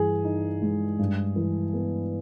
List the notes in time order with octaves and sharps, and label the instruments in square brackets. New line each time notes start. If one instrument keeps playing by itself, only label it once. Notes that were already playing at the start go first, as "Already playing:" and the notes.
Already playing: [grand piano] G2 E3 [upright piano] G#4
[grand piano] D#4
G#3
G2
E3
B3